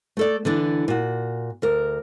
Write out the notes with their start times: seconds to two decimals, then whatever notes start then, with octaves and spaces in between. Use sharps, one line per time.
0.17 A3 A4 D5
0.45 D3 E3 D4
0.88 A#2 F#4
1.62 D2 A#4